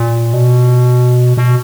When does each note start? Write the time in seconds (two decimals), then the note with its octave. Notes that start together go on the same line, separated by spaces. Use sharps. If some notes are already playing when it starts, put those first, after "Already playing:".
Already playing: A#2
0.33 B2
1.37 B2